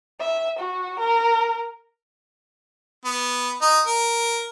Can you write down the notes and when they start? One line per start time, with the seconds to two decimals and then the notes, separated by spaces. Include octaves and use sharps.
0.20 E5
0.59 F#4
1.00 A#4
3.04 B3
3.61 D#4
3.87 A#4